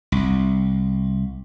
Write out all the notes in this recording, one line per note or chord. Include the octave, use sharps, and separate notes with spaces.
C2